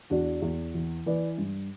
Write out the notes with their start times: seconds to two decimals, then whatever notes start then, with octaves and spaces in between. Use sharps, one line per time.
0.10 E2 D4 F#4
0.42 E2
0.74 E3
1.06 E3 B4 D5
1.38 G2